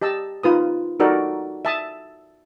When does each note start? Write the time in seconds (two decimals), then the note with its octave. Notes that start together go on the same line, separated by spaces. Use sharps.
0.02 G4 D#5 A5 E6
0.43 D#4 F4 B4 D#6
1.00 D#4 F#4 A4 A#4 D5
1.65 E5 A5 D#6